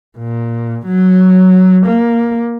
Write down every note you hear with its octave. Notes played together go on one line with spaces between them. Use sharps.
A#2
F#3
A#3